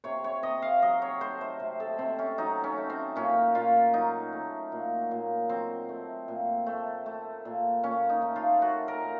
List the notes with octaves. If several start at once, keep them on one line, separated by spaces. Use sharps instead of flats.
C3 C#5
C#5
C3 D#5
F5
F#3 D#5
C#5
A3 C5
C5
C3
A4
C3 C4
C#4
F#3 D#4
C#4
A3
C4
A#2 C#4
A#2 F4
F#3 D#4
A3
A#2
A#2
F#3 C4
A3
A#2
A3
A3
A#2
A#2 C#4
D#4
A3
F4
A3 F#4
A#4
A#2